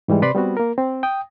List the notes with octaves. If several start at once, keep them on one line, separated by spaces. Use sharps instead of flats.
G#2 E3 G3 G#3
C3 B4 D5 B5 C6
G3 B3 C4 F#4
A#3 A#4
C4
G5 D#6